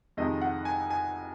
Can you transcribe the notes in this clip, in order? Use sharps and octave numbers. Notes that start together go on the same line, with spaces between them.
F2 C3 D#3 G#3 D#5
F#5
G#5
G#5